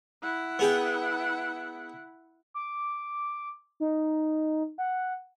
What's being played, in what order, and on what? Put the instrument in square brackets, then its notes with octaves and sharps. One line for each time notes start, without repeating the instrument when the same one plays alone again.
[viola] E4 F#5
[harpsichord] B3 G#4 G5
[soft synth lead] D6
D#4
F#5